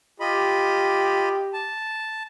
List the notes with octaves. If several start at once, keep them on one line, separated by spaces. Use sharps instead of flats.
F4 G4 D#5 B5
A5